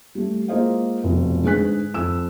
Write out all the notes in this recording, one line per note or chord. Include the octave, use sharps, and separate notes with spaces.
G3 A3
G#3 A#3 F4 C5 D#5 F5
F1 B1 B2 F3
G#2 D3 G#4 B4 F#6 B6
F2 E6 E7